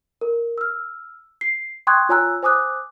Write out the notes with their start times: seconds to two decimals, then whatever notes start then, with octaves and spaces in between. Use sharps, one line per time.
0.21 A#4
0.58 E6 F6
1.41 C7
1.87 G5 C6 C#6 D#6 F#6 G#6
2.09 F4 C#5 G#5 A#5 E6 F#6
2.43 C5 G#5 D6 D#6 F#6